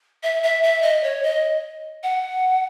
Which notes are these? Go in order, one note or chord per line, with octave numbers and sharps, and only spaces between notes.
E5
E5
E5
D#5
C#5
D#5
F#5